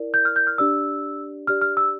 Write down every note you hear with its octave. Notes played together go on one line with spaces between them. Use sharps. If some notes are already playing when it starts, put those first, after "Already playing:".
Already playing: E4 A#4 D5
G6
F6
G6
F6
D4 G4 D5 E6
D4 G4 D5 F6
F6
E6